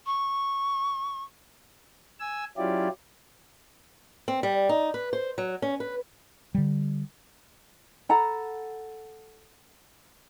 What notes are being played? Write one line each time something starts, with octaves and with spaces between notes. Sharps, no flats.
C#6
G#5 E6
F#3 C#4 E4 F4 G4 D5
C4
G3
D#4
B4
C5
F#3
C#4
B4
D3 G3
A4 F#5 A#5 B5